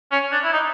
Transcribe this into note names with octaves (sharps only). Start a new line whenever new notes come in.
C#4
D4
E4
D#4